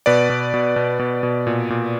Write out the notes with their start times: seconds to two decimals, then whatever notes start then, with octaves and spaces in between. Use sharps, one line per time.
0.06 B2 B4 D5
0.30 B2
0.54 B2
0.76 B2
0.99 B2
1.23 B2
1.47 A#2
1.70 A#2